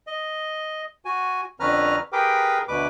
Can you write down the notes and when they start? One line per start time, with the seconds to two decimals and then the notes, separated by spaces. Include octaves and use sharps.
0.07 D#5
1.05 F#4 G#5
1.60 F2 D3 C#4 B4 A#5 F6
2.13 G4 G#4 A#4 B4 G5 D6
2.68 D2 B2 B4 D6